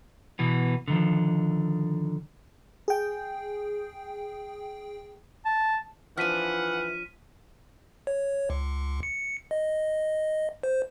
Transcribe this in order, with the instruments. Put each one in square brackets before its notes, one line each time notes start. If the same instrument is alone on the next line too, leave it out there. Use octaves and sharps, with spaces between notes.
[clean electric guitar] B2 E3 B3
D3 D#3 F3
[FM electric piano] G#4 G5
[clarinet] A5
[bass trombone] E3 [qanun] F3 D4 [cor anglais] F#5 [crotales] F6 B6 D#7
[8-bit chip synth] C#5
C#2
C#7
D#5
C5